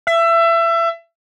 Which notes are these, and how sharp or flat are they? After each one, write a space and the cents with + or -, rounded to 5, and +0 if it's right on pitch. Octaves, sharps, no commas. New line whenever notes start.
E5 +25